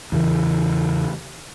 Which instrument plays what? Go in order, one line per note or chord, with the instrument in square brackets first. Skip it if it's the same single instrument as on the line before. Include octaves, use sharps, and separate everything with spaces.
[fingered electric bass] E2 C#3 E3